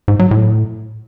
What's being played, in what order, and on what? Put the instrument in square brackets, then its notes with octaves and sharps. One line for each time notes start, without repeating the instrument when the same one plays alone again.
[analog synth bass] G#2
F#3
A2